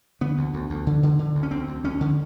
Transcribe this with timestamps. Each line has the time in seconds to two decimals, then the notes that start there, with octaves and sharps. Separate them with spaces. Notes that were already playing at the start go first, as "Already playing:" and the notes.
0.21 D3 B3
0.37 D2
0.54 D2
0.70 D2
0.87 D3
1.03 D3
1.19 D3
1.35 D2
1.43 C#4
1.51 D2 C4
1.67 D2
1.84 D2 C#4
2.01 D3